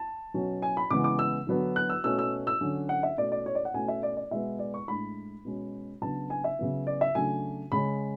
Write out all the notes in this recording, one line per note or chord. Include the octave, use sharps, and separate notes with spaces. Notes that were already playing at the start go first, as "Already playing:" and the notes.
Already playing: A5
B2 F#3 C#4
G#5
B5
C#3 E3 G#3 B3 D6
D6
E6
D3 F#3 B3 D4
F#6
E6
B2 A3 C#4 E6
E6
E6
D3 F#3 C#4
F#5
E5
B2 A3 C#4 D5
D5
C#5
D5
F#5
B2 A3 C#4 G#5
E5
D5
D5
B2 G#3 B3 E5
D5
C#6
A2 G#3 D4 B5
B2 G#3 C#4
C#3 F#3 B3 D4 A5
G#5
E5
C#3 F#3 B3
D5
E5
C#3 F#3 A3 D4 G#5
C#3 G#3 C#4 B5